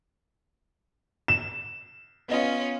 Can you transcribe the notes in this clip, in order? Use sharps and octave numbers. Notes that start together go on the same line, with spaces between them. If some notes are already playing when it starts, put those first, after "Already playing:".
E7
B3 C#4 F4 D#5